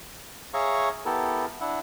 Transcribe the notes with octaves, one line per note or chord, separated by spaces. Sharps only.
G#4 C#5 E5 F5 A#5 C#6
B3 E4 G4 A4 A#4
D4 E4 E5 F#5